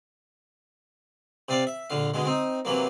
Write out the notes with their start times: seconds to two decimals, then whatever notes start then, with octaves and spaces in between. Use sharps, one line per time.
1.49 C3 C4 D5 F5
1.67 E5
1.90 A#1 D3 F5
2.14 B2 D3 G#3
2.26 C4 D#4
2.65 C3 E3 F#3 A#3